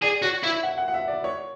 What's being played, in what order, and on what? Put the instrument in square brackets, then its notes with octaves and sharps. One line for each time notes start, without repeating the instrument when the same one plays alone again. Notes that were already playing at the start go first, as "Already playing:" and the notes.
[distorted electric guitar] G#4 [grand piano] D5
[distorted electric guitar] F#4 [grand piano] C#5
[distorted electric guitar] E4 [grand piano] E5
[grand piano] F#5
F#5
F#5
E5
D5
C#5